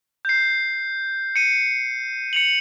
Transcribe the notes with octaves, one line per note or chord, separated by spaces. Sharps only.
G6 C7
C#7 D#7
C#7 F7 F#7